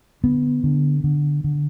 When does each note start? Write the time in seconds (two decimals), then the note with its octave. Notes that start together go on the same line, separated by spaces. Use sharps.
0.24 D3 B3
0.64 D3
1.04 D3
1.44 D3